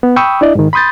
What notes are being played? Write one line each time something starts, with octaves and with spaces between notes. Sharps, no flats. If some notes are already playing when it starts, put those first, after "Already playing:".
B3
G5 B5 C#6 D#6 E6
D4 E4 D5 D#5
G#2 D#3
B5 C6 D#6 G6 A6